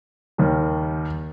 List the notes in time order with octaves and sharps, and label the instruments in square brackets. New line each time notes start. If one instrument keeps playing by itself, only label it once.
[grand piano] D#2 D#3 G3